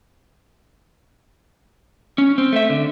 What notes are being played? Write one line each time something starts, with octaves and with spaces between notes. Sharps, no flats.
C#4
C4
A3 E5
D3